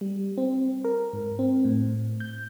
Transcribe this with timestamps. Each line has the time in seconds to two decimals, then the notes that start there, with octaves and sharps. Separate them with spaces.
0.01 G3
0.38 C4
0.85 A#4
1.13 G#2
1.39 C4
1.65 A2
2.20 G6